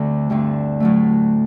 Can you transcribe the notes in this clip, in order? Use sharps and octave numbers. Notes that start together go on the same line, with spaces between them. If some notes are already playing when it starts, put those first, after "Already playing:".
Already playing: D2 D3 A3 C4
G2 D3 A3 C4
A2 F#3 A3